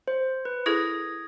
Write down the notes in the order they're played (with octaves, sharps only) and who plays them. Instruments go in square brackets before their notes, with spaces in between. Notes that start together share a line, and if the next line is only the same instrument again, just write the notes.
[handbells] C5
B4
[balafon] E4 G#4 A4 [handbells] D#6 G#6 A#6